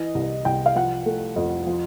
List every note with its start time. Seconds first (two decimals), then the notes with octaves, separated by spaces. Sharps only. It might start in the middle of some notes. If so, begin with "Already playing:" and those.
Already playing: E3 D#5
0.15 C2
0.45 C2 G5
0.66 F5
0.76 F3 F#5
1.06 A3
1.36 F2
1.67 F3